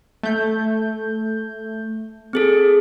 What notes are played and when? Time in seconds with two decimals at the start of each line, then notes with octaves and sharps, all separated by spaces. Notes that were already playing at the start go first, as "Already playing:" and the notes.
0.23 A3 G6
2.33 C4 G#4 A4